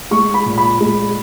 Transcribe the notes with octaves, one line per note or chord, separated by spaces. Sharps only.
G#3 C#6
B5
A#2
B5
G#3